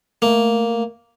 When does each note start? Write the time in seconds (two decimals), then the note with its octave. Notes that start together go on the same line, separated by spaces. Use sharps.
0.22 A3 A#3